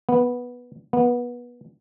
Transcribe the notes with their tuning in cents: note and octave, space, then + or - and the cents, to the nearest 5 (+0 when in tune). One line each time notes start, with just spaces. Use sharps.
B3 -10
B3 -25